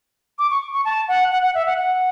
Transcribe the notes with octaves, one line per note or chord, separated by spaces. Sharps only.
D6
C#6
C#6
A5
F#5
F#5
F#5
E5
F#5
F#5